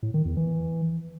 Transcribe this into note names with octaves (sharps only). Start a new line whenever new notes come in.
A2
D#3
E2
E3